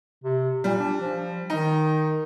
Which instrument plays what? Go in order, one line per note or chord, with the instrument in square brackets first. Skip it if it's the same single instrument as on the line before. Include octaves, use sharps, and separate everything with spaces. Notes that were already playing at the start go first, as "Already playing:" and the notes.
[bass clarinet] C3
[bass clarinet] A#2 [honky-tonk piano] G3
[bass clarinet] D4
F3
[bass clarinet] D#3 [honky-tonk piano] D#4